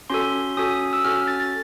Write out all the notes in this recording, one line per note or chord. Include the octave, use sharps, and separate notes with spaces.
C#4 F#4 A4 C6
C#4 F#4 A4 D#6
E6
C#4 F#4 A4 F6
A6
A6